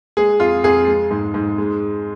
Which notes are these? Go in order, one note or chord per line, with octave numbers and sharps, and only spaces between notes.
G#3 G#4
F2 F4
F2 G#4
G#3
G#2
G#2
G#3